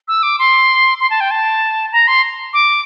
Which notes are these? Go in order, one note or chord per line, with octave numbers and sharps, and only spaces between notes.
E6
D6
C6
C6
A5
G5
A5
A#5
C6
D6